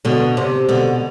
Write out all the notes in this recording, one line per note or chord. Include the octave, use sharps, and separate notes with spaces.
B2 D3
C3
B2 D3